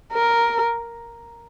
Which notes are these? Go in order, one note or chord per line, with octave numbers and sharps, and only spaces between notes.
A#4